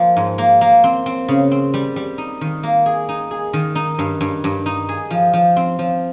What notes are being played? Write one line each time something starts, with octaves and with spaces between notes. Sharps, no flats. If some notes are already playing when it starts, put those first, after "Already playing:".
Already playing: F3 A#3
G#2
A#3
A#3
C4
C4
C#3
C4
G3
G3
D#4
D#3
A#3
G#4
D#4
G#4
D#3
D#4
G2
G2
G2
D#4
G#4
F3
F3
C4
F3